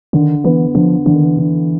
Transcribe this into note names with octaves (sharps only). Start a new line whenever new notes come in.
D3 D#3
E3 B3
D3 F3
D3 E3
D#3
E3
D3